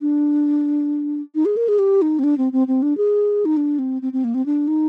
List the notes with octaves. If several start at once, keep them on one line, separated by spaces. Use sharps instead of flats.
D4
D#4
G#4
A#4
G#4
G4
D#4
C4
D4
C4
C4
C4
D4
G#4
D#4
D4
C4
C4
C4
A#3
C4
D4
D#4